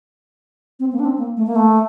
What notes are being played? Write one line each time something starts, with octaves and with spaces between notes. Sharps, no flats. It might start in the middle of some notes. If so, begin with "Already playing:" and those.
C4
A#3
D4
C4
A#3
A3
A#3
A3